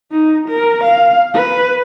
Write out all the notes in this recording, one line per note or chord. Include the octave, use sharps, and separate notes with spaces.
D#4
A#4
F5
B4